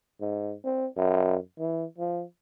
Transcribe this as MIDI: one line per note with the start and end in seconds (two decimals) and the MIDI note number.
0.20 0.54 44
0.64 0.86 60
0.97 1.36 42
1.59 1.84 52
1.98 2.23 53